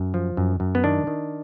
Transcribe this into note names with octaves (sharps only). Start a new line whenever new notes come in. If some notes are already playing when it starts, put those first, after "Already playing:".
Already playing: F#2
F3
F#2
F#2
B3
D#3 D4
D#3